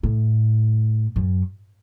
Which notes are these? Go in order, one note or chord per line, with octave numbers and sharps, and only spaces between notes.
A2
F#2